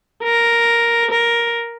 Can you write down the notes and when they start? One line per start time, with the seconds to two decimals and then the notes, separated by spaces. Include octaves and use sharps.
0.23 A#4
1.11 A#4